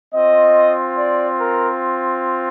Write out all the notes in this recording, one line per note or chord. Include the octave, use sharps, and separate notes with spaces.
C4 F4 D#5
D5
A#4